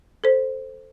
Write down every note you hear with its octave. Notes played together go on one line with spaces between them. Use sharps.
A4 C5